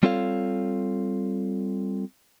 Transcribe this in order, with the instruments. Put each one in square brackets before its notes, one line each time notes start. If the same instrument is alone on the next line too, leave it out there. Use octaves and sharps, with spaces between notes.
[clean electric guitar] G3 C4 F4 A4 C#5 F5